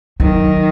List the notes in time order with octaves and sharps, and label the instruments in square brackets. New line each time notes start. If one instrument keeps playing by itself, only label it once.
[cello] D#3 [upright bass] F#3